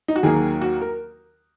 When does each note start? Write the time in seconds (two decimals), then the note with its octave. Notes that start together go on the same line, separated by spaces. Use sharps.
0.08 D#4
0.16 F#4
0.23 D#2 D#3 F#3 A#3 G#4
0.61 F#4
0.81 A#4